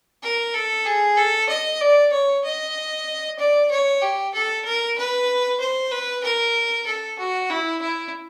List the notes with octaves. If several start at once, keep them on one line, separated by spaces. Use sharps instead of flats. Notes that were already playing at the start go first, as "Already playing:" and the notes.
A#4
A4
G#4
A4
D#5
D5
C#5
D#5
D5
C#5
G4
A4
A#4
B4
C5
B4
A#4
A4
F#4
E4
E4